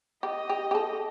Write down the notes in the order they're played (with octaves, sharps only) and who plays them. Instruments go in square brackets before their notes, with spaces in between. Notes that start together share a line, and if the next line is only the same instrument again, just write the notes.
[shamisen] G4 [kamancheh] D#5
[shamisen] G4
G4
A4